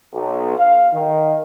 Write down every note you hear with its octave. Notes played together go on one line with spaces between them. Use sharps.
B1
F5
D#3